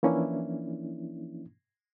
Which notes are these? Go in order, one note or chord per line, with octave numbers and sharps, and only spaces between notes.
E3 F3 A#3 C#4 D4 E4